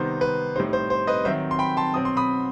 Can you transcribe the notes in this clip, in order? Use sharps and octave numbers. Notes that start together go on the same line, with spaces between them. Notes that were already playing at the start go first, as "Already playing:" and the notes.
Already playing: C3 D#3 G3 B3 D#4 C5
B4
A2 G3 D#4 C5
C5
C5
B4 D#5
D#3 F#3 C4 C5 E5
C6
G5 B5
A5 C6
B2 F#3 C4 D#6
C6
B5 D#6